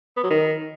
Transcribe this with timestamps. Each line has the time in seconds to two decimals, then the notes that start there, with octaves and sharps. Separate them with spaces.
0.17 B3
0.24 F#3
0.31 D#3